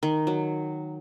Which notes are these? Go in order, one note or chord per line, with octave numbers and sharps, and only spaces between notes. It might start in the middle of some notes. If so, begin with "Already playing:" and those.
D#3
F#3